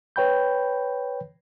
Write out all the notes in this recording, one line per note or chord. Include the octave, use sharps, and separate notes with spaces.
B4 C#5 G5 B5 G6